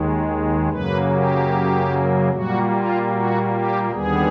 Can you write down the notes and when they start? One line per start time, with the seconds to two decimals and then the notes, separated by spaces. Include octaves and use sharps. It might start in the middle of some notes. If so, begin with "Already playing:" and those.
Already playing: D#2 D#3 G#3
0.69 F#2 C#3 F#3 A#3 B4
1.09 G4
2.30 A#2 G3 A#3 F#4
2.70 F4
3.10 F#4
3.51 G4
3.91 D#2 D3 G3 B3 G#4